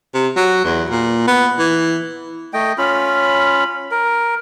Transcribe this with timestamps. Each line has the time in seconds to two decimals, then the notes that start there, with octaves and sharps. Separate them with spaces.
0.14 C3
0.36 F#3
0.64 E2
0.90 A#2
1.27 B3
1.59 E3
2.53 A3 D#5 G5
2.78 C#4 F4 B5
3.91 A#4